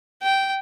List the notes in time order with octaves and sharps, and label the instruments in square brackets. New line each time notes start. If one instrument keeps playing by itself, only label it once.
[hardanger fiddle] G5